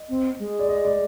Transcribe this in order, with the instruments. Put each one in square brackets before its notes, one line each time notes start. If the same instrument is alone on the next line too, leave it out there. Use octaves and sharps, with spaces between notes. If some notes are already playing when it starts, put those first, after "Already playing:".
Already playing: [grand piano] D#5
[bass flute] C4
G#3
[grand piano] D5
D#5
D5